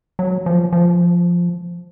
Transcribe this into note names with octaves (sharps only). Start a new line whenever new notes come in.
F#3
F3
F3